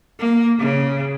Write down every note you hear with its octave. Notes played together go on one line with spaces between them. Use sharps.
A#3
C#3